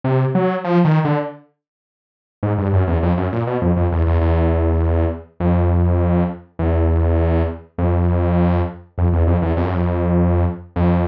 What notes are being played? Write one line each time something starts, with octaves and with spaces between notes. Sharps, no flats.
C3
F#3
F3
D#3
D3
G#2
G2
F#2
E2
F2
F#2
A#2
B2
F2
F2
E2
E2
E2
F2
E2
F2
F2
E2
F2
E2
F2
F#2
F2
F2